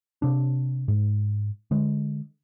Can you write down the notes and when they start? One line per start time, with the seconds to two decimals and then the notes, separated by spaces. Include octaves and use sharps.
0.22 C3 D4
0.88 G#2
1.71 D3 G#3